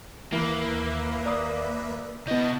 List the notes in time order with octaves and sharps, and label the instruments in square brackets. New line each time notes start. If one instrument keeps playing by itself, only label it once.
[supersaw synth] D#2 B4 E5 [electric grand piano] E3 [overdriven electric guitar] A#3
[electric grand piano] D5 A#5 D#6
[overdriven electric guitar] C3 D#5 [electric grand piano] B3 G6 [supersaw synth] E4 A5